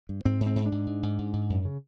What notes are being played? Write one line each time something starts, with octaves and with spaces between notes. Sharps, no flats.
G2
G#2 C4
G#2
C4
G#2
D4
G#2
G#2
G#2
G#2
G#2
F#2
C#3